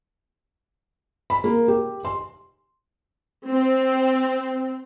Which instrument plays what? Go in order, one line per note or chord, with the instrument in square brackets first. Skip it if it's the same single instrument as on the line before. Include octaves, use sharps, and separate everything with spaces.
[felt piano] B5
A#3
G4
C6
[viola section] C4